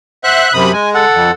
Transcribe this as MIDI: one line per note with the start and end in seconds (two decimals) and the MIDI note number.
0.24 0.48 72
0.24 0.53 76
0.24 0.48 78
0.24 0.53 90
0.53 0.72 42
0.53 0.72 48
0.53 0.72 83
0.53 0.70 87
0.73 1.05 56
0.73 0.89 80
0.95 1.31 69
0.95 1.31 78
1.13 1.31 41